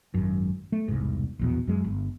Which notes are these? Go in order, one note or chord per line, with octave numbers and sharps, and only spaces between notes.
G#1 F#2
A3
E1 C2 G#2
A#1 E2 B2
F#2 G#3
G1